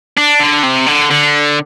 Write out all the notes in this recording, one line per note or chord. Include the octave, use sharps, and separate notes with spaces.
D4
D3
C3
D3
D3